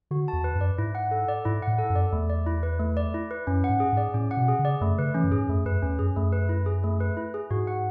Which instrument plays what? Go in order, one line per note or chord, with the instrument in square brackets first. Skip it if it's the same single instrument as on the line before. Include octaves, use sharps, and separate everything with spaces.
[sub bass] D3 [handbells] F#4
[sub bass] E2 [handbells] A5
[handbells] B4
[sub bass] F#2
[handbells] D5
[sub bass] G#2 [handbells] E4
[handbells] F#5
A4
D5
[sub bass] G#2 [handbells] E4
[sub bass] A2 [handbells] F#5
[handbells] A4
[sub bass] F#2
[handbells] D5
[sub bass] E2 [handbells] A3
[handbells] D5
E4
B4
A3
D5
E4
B4
[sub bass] F#2 [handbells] C#4
[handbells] F#5
[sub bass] G#2
[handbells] G#4
[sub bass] G#2 [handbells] D5
[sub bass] A2 [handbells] C#4
[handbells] F#5
[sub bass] B2
[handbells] G#4
[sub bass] C#3
[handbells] D5
[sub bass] F#2 [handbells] A3
[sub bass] C#3 [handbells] B4
[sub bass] E3 [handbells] C#4
[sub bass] F#2
[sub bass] G#2 [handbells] G#4
[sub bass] F#2 [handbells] A3
[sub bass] F#2 [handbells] B4
[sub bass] E2 [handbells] C#4
[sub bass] F#2 [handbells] G#4
[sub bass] F#2 [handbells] A3
[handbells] B4
E4
G#4
A3
B4
E4
G#4
[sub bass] G#2 [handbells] F#4
[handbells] F#5